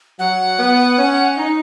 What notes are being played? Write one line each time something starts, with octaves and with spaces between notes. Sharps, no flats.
F#3 F#5
B3
C#4
D#4